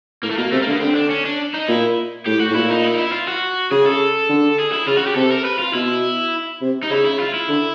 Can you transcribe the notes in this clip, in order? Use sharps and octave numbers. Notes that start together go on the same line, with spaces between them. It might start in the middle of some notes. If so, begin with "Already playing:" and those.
A2 A#3
A3
B2 A#3
C3 A3
D3 A#3
B3
D3 C4
D4
C#4
D4
D#4
A#2 E4
A2 G4
F#4
A2
A#2 E4
D#4
E4
D#4
E4
F4
F#4
C#3 G#4
A4
D3
G#4
E4
C#3 F4
F#4
G4
C3 A4
A#4
B4
F4
B2 E4
C3
D#4
C#3 E4
E4
F4
E4
D3